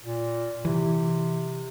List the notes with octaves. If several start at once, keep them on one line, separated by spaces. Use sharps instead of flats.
A#2
C3 E3